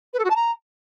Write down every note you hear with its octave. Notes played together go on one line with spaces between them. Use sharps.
B4
A4
F#4
A5
A#5